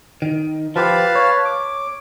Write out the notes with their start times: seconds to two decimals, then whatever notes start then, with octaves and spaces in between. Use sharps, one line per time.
0.22 D#3
0.76 F3 F4 G4 B4 F5 A5
1.15 C#5
1.45 D6